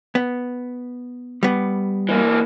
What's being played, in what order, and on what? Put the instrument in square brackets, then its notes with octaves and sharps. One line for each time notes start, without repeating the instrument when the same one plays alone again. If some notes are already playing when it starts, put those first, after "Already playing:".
[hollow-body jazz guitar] B3
G3 B3
[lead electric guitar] E3 A#3